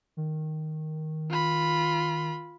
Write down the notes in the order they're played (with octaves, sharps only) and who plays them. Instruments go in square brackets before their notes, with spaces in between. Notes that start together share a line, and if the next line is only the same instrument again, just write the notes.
[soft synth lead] D#3
[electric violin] F4 B5